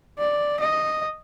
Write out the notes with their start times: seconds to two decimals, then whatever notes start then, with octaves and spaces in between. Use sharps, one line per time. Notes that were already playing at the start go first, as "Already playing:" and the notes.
0.19 D5
0.60 D#5